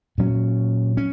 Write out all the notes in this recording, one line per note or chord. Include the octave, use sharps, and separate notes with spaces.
A#2 F#3 C#4
C#4